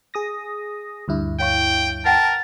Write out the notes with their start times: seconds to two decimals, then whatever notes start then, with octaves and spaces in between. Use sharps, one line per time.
0.14 G#4 D#6 A#6
1.08 D2 G2 E4
1.40 C#5 F5 G5 C#6
2.05 A#4 B4 F#5 G5 A5